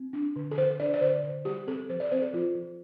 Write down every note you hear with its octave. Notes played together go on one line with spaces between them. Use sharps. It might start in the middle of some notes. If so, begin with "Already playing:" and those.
Already playing: C4
D4
D3
A4
D3 C5
D4 D5
D5
D3 C5
D3
G3 G4
C4 A4
F3 C5
D5
C4 C5
A4
F3 F4
F3